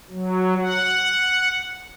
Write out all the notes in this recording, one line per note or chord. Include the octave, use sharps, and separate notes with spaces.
F#3
F#5